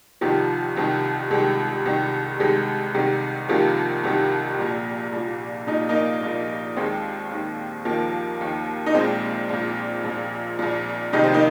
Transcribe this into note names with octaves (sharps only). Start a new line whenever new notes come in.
C2 C3 D#3 F3
C2 C3 D#3
C2 C3 D#3 G#3
C2 C3 D#3
C2 C3 D#3 G#3
C2 C3 D#3
C2 C3 D#3 F3 A#3
C2 C3 D#3
A#1 A#2
A#1 A#2
A#1 A#2 D#4
A#3 D#4
A#1 A#2
D#2 D#3 G#3 C4
D#2 D#3
D#2 D#3 F3 A#3
D#2 D#3
D#4
A#1 A#2 G#3 C4
A#1 A#2
A#1 A#2
A#1 A#2
F1 F2 C3 D#3 D#4
C4
A#3 D#4